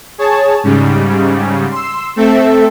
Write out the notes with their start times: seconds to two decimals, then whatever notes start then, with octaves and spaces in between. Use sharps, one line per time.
0.18 G#4 C#5 A5
0.63 G#2 C#3 G3
1.71 C6 E6
2.16 A3 C4 A4 E5